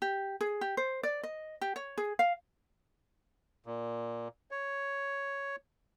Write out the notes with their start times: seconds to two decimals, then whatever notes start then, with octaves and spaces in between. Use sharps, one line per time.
0.02 G4
0.41 G#4
0.61 G4
0.77 C5
1.03 D5
1.23 D#5
1.61 G4
1.76 C#5
1.98 G#4
2.19 F5
3.66 A#2
4.51 C#5